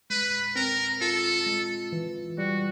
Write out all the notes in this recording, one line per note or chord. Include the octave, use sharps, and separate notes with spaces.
G#3 B4
C4 A#4
F4 A4
G#3
E3
G3 F#4